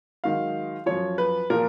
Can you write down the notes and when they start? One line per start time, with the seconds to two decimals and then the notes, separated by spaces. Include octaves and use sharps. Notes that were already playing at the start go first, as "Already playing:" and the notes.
0.24 G#2 D#3 F#3 F5
0.86 F#2 F3 C#5
1.18 B4
1.50 A#2 F3 A#4